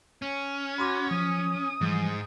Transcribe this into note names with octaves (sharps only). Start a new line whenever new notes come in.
C#4
F#4 B5 C6 D6
F3 D#6
G#2 E3 F3 G3